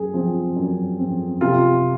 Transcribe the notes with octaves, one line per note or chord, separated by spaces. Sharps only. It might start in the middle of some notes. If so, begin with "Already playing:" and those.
Already playing: F#2 G#4
F3 C4
F#2
F3 C4
C3 F4